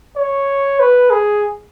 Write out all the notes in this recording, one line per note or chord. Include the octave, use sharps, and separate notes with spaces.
C#5
B4
G#4